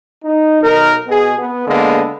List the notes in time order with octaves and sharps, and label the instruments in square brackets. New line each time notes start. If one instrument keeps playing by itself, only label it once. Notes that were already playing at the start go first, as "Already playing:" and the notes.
[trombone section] D#4
B1 D#4 A#4
B2 G#4
B3
D3 G#3 A#3 B3